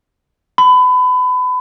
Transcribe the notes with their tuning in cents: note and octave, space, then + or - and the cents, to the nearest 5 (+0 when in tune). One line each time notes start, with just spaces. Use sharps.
B5 +30